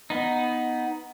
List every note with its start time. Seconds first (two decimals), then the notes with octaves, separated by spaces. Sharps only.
0.10 B3 D#4